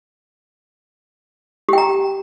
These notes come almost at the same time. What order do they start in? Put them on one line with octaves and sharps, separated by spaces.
G4 G5 A#5